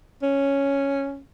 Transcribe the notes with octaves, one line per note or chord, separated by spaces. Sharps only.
C#4